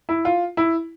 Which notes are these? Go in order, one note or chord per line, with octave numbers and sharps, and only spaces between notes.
E4
F4
E4